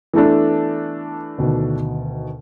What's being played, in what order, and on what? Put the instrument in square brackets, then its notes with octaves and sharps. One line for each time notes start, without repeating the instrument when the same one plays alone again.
[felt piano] E3 A3 D4 [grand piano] B3 A4
[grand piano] D2 B2 D#3